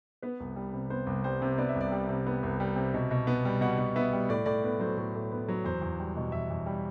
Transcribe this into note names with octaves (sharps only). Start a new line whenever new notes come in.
B3 B4
C2
G3
C3
B3 C5
C2
G3 C5
C3
B3 D5
E5
C2
D5
G3
C3
B3
C2
G3
C3
B2
B2
B3
G3
B2 F#5
B2
B3 E5
G3
A2 D5
A2 D5
B3
F#3 C5
A2
A2
B3
F#3
E2 C5
E2
G3
B2
E2 E5
E2
G3